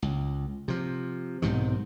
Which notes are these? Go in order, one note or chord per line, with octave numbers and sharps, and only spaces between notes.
C#2
C3 F3
B1 G#2 C3 D#3